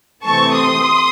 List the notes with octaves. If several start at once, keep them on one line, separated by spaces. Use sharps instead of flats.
C3 E3 A3 C4 A5 C#6
C6 D#6